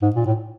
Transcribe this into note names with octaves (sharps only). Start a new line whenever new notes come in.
G#2
A#2
A2